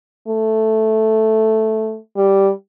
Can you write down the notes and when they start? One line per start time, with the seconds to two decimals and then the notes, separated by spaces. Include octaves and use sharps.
0.28 A3
2.17 G3